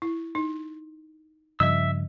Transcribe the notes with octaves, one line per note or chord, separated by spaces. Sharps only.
E4
D#4
G2 C#3 F3 D#5 E5 E6